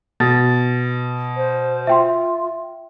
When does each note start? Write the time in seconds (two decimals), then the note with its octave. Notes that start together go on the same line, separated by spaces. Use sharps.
0.20 B2 A6
1.37 C5
1.87 F4 E5 G5 C6